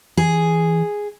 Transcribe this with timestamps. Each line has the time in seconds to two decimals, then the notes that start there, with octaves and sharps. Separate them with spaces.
0.17 E3 G#4